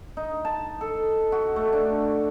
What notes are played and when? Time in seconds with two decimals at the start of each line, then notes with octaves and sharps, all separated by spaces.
0.17 D#4
0.45 A5
0.81 A4
1.32 F#4
1.56 A3
1.73 D4